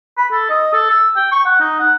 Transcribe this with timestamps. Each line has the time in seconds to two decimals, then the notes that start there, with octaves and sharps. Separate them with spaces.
0.17 B5
0.32 A4
0.50 D#5
0.73 A4
0.90 E6
1.16 G5
1.32 C#6
1.45 F#5
1.60 D#4
1.80 F#5